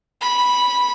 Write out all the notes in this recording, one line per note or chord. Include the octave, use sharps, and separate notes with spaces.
B5